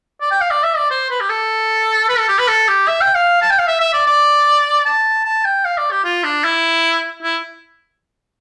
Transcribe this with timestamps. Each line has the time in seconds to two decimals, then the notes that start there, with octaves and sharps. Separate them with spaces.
0.21 D5
0.31 G5
0.41 F5
0.51 D5
0.63 E5
0.77 D5
0.90 C5
1.10 B4
1.20 G4
1.29 A4
2.09 B4
2.18 A4
2.29 G4
2.38 B4
2.48 A4
2.68 G4
2.87 E5
3.01 G5
3.14 F5
3.42 A5
3.50 G5
3.59 F5
3.67 E5
3.80 E5
3.93 D5
4.07 D5
4.86 A5
5.25 A5
5.45 G5
5.65 F5
5.78 D5
5.91 G4
6.04 F4
6.24 D4
6.44 E4
7.23 E4